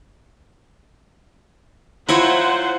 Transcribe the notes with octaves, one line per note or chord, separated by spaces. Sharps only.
F#3 E4 F4 C5 C#5 F#5